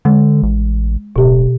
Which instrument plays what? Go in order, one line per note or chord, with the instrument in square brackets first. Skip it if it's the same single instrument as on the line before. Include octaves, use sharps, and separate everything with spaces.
[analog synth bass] D3 [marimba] G#3
[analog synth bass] A1
[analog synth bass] D1 [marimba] B2 G4